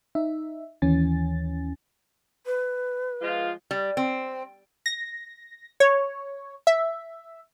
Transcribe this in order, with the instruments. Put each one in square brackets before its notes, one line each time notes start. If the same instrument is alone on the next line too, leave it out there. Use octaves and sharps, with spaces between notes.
[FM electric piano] D#4 E5
D#2 E3 C#4 G#5 A6
[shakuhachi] B4
[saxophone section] F3 G#3 F4
[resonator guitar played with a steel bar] G3
C4
[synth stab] A#6
C#5
E5